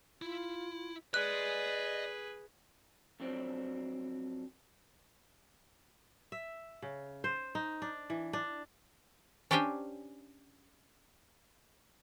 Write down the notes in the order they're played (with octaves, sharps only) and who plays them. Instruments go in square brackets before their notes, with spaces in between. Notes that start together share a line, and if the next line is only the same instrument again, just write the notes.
[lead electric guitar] E4 [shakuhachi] F4
[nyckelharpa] G#4 B4 [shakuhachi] D5 [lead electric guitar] D#5 G#5 [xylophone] F#6
[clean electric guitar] F2 B2 D3 F#3 C4 D4
[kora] E5
C#3
C5
D#4
D4
E3
D4
[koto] C#4 D4 G4 C5 G5 G#5